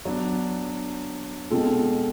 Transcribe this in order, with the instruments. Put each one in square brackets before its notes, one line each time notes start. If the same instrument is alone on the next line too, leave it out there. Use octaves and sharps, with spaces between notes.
[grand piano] F#3 B3 D4
B2 G#3 C4 F4 A4